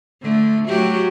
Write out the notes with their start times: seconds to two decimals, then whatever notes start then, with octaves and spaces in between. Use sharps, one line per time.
0.22 D3 A3
0.67 F#3 F#4 G4